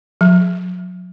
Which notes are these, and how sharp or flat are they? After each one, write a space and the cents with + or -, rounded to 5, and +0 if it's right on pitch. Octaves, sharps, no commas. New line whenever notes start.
F#3 -35